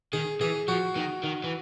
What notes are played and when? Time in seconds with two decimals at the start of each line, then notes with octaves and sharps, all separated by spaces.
0.13 D#3 G#4
0.41 E3 G#4
0.68 F3 F#4
0.96 D#3
1.23 D#3
1.44 E3